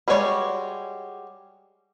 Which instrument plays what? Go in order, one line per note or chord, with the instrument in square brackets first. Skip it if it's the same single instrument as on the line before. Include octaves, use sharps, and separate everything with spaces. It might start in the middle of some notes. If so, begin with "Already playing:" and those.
[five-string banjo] G3 G#3 F#4 C#5 D5